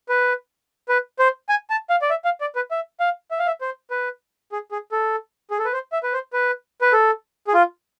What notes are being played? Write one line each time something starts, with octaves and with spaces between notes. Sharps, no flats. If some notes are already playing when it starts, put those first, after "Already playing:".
B4
B4
C5
G#5
A5
F5
D5
E5
F5
D5
B4
E5
F5
E5
F5
E5
C5
B4
G#4
G#4
A4
G#4
A4
B4
C5
E5
B4
C5
B4
B4
A4
G#4
F4